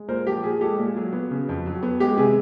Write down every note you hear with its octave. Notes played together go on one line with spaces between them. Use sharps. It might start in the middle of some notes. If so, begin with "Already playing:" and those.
Already playing: G#3
A#2 A#4 C5
F3 G4
A#2 G#4
G#3 G4 A4
A#2
F#3
B3
C#3
F2
F#3
B3
G#3 G4
C3 G#4